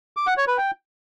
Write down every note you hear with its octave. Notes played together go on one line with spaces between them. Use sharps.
D6
F#5
C#5
B4
G5